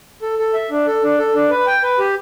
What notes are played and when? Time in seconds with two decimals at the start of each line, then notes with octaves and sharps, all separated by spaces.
0.22 A4
0.39 A4
0.54 E5
0.70 D4
0.87 A4
1.03 D4
1.18 A4
1.34 D4
1.50 B4
1.67 G5
1.83 B4
1.99 G4